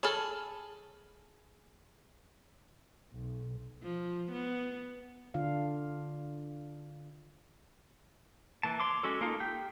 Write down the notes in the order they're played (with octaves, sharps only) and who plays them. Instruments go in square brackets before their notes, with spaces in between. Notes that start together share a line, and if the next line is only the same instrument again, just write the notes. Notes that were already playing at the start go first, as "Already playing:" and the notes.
[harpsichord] G#4 [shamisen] A4 C#5 [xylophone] A5 B5 F6
[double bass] B1
[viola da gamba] F3
B3
[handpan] D3 D4 F4 F5
[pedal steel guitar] E3 A#3 A5
C#5 C6 D6
G#3 C#4 F#4 A4
A#3 D#4 F4 A4
G4 G5 G6